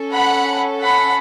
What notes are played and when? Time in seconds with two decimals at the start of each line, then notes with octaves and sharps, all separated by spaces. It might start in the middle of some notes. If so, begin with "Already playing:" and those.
Already playing: C#4 A4
0.12 F#5 B5
0.83 F#5 B5